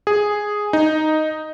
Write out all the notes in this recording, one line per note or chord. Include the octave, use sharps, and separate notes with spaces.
G#4
D#4